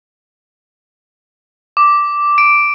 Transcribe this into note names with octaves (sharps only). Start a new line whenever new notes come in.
D6
D7